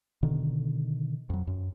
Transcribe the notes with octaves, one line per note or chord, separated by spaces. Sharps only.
B2 D3 D#3
F2 F#3
F#2